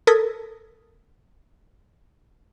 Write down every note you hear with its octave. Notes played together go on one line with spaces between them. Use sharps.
A4 A#4 D#6 G#6 B6